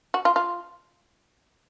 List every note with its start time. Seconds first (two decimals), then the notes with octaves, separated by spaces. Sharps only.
0.14 F#4
0.25 F4
0.36 F4